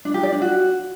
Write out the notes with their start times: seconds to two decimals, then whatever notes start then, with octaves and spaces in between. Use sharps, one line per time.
0.05 D4
0.14 G4
0.23 D5
0.33 D4
0.42 F#4